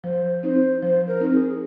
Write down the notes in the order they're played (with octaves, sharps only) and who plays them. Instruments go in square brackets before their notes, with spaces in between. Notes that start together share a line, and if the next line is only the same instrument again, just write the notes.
[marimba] F3 [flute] C5
[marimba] C4 D#4 [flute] C5
[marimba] F3 [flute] C5
[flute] A#4
[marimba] C4 D#4
[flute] G#4